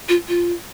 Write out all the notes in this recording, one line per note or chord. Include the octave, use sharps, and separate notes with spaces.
F4
F4